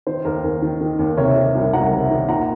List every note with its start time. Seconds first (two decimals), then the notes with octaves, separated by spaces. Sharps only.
0.07 D#3 C5
0.25 D#2 A#4
0.44 D#2
0.62 D#3
0.81 D#3
0.99 D#2
1.17 C3 A#4 C#5
1.36 D#3
1.55 C2
1.73 C2 F#5 A#5
1.92 C3
2.11 D#3
2.29 A#2 F#5 A#5